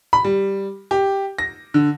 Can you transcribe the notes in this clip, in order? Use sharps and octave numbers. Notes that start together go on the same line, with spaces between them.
B5
G3
G4
A#6
D3